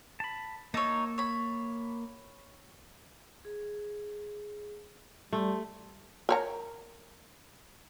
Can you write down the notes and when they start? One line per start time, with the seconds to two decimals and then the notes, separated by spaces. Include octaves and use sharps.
0.20 A5 B5
0.74 A#3 D#4 C#5 A5 E6
1.18 C#5 B5
3.45 G#4
5.33 G3 A3 G4 A5 C6
6.29 A#4 C#5 A#5